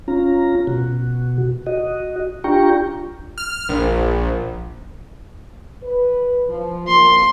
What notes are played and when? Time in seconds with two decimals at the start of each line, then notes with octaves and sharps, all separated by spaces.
0.08 C#4 F4 A#5
0.67 B2 F#4
1.67 F#4 D#5
2.44 D4 F4 G4 G5 A#5 C#6
3.38 F6
3.69 A#1
5.83 B4
6.49 F3
6.88 A#2 F3 A#3 C6